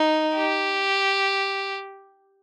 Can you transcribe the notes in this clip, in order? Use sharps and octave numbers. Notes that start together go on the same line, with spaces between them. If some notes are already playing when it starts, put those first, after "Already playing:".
Already playing: D#4
G4